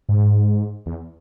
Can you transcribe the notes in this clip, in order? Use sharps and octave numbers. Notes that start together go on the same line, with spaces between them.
G#2
E2